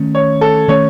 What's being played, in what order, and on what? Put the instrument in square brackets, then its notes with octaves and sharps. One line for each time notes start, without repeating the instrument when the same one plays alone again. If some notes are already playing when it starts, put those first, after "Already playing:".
Already playing: [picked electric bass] D#3 A3 C#4
[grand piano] C#5
A4
[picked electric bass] D#3 A3 C#4 [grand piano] C#5